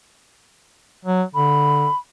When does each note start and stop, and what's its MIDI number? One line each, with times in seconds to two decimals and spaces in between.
1.05 1.23 54
1.35 1.87 50
1.35 1.97 83